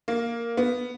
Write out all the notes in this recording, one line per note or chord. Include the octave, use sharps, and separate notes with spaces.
A#3
B3